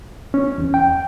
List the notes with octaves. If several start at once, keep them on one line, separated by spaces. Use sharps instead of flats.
C#4
E2
G5